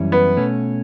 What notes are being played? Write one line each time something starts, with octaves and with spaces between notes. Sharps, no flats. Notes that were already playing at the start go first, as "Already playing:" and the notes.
Already playing: F#2 E3 G3 C#4 E4
B3
B2 A3 C#4